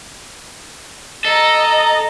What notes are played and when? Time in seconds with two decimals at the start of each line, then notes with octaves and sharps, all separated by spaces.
1.25 A4 D#5 A#5